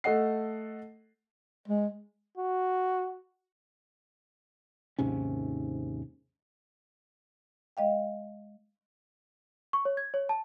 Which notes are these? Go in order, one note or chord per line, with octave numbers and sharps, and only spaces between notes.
A3 A4 D#5 F#5 C7
G#3
F#4
D#2 G#2 C3 C#4
G#3 D#5 F5 G5
C#6
C#5
G#6
C#5
A5